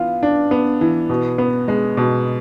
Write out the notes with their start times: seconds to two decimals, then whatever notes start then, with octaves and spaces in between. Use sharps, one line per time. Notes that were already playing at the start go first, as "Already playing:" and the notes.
Already playing: E3 B3 F4
0.23 D4
0.51 B3
0.81 E3
1.09 B2
1.38 B3
1.68 G#3
1.97 B2